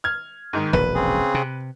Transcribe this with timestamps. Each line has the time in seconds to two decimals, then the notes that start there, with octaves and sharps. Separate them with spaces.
0.04 F6 G#6
0.53 G#2 D#3
0.73 E1 A#1 B4
0.94 C#3 C4 G#4
1.34 C3